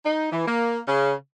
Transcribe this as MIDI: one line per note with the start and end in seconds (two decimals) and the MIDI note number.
0.05 0.30 63
0.32 0.45 52
0.47 0.80 58
0.88 1.14 49